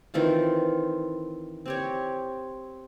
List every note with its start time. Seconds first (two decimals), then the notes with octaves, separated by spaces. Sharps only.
0.14 D#3 E3 C4 F4
1.66 C4 G4 C#5